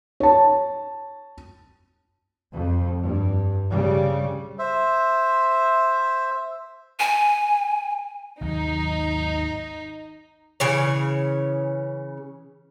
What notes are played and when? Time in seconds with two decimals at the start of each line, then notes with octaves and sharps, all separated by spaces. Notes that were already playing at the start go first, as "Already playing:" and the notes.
0.20 C#5 A5
2.50 F2
3.03 G2
3.70 C#3 G3
4.59 C5 E5
6.99 G#5
8.41 G#1 D#2 F#3 D#4
10.60 C#3 E3 C#5